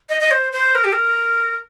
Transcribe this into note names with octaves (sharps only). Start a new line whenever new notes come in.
D#5
D#5
C5
C5
A#4
G4
A#4